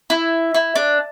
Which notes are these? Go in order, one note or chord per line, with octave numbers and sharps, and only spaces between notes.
E4
E4
D4